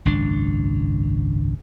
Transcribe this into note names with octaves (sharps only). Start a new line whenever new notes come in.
G#1 C#2 F#2 D4